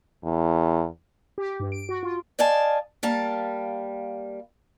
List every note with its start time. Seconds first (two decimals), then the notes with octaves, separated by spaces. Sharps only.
0.24 E2
1.38 G4
1.60 G2
1.72 D7
1.89 F#4
2.03 F4
2.39 D5 D#5 F5 G#5 A5
3.03 G3 A#3 F5 A5